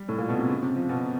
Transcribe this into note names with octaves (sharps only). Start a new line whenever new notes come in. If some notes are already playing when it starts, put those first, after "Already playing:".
Already playing: G3
A2
A#2
B2
C3
C#3
C3
F3
B2